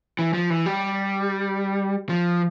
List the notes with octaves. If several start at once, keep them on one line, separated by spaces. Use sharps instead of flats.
E3
F3
E3
G3
F3